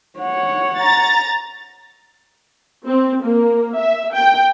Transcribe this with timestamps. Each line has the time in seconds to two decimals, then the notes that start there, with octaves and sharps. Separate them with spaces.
0.19 C#5 F#5
0.77 A#5 A6
2.87 C4
3.23 A#3
3.78 E5
4.15 G5